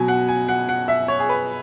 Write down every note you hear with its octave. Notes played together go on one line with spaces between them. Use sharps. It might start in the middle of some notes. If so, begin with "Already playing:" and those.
Already playing: B2 F#3 G#5
F#5
G#5
F#5
F#5
E5
C#5
G#4
B4